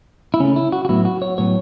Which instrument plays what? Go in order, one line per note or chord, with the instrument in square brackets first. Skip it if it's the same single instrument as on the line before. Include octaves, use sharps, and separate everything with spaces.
[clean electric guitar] E4
C#3 A3 C#4
E4
F#4
F#4
A2 F#3 B3 E4
F#4
C#5
A2 F#3 B3 C#5